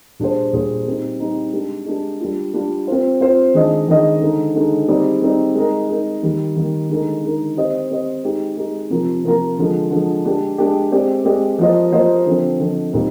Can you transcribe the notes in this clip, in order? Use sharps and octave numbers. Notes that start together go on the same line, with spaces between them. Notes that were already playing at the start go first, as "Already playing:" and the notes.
A#2 G3 D4 G#4 C5
A#2 G3 D4 G#4 C5
G3 C4 D#4
G3 C4 D#4
G#3 D4 G4
G#3 D4 G4
G3 D4 F4
G3 D4 F4
C4 F4 C5
C4 F4 C5
D#3 G#3 D4 G#4 D#5
D#3 G#3 D4 G#4 D#5
D3 G#3 D#4
D3 G#3 D#4
G3 C4 D#4 G#4 D5
G3 C4 D#4 G#4 D5
G#3 D#4 A#4
G#3 D#4 A#4
D#3 G3 A#3
D#3 G3 A#3
D3 G#3 D#4 A#4
D3 G#3 D#4 A#4
C4 G4 C5 D#5
C4 G4 C5 D#5
G#3 D#4 G4
G#3 D#4 G4
C3 F3 A#3 F4 A#4
C3 F3 A#3 F4 A#4
D3 F3 G#3
D3 F3 G#3
G#3 D4 G4
G#3 D4 G4
G#3 C4 G4 D5
G#3 C4 G4 D5
F3 A#3 F4 C5 D#5
F3 A#3 F4 C5 D#5
D3 F3 C4
D3 F3 C4
A#2 G3 C4 D#4